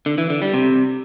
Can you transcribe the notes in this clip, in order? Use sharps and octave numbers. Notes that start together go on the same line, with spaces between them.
D3
E3
D3
G3
C3